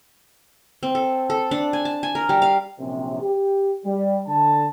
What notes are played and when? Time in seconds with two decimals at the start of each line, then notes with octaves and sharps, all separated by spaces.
0.83 C4
0.95 A4
1.30 A4
1.51 D4
1.73 G#5
1.85 A5
2.03 G#5
2.15 A#4
2.29 G3
2.42 F5
2.79 A#1 F#2 C3
3.22 G4
3.85 G3
4.27 D3 A5